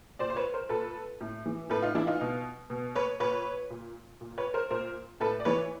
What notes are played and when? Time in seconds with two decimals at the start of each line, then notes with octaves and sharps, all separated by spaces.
0.19 A#2 C5 D5
0.30 C5
0.36 B4 C#5
0.54 A#4 C5
0.69 A#2 A4 B4
1.21 A2
1.46 E3
1.70 A2 A4 B4
1.82 D#4 F4
1.95 E3 D4 E4
2.07 D#4 F4
2.21 B2
2.70 B2
2.95 B4 C#5
3.20 A#2 B4 C#5
3.70 A#2
4.21 A#2
4.38 B4 C#5
4.54 A#4 C5
4.71 A#2 A#4 C5
5.20 A2 A4 B4
5.40 D5
5.45 E3 B4 C#5